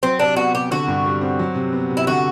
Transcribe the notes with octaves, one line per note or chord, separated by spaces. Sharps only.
F#3 C4
C3 D4
B3 F#4
C3 G4
D3 F#4
G2
G3
C4
F#3
C3
B3
C3
E4
D3 F#4